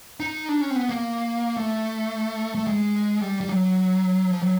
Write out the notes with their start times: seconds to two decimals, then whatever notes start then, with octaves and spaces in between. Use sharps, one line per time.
0.20 D#4
0.49 D4
0.61 C#4
0.70 C4
0.76 B3
0.90 A#3
1.57 A3
2.55 A3
2.67 G#3
3.21 G3
3.41 G3
3.49 F#3
4.31 F3
4.42 F#3